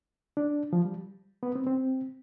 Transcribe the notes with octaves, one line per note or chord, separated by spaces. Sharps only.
D4
F3
G3
B3
C4
C4